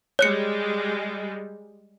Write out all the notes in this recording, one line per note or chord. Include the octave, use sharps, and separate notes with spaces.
G3 G#3 C#5 F#6 C#7